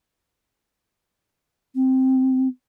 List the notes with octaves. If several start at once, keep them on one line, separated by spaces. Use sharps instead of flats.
C4